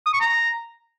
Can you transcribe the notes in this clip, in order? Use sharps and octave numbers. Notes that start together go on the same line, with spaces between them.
D#6
C#6
A#5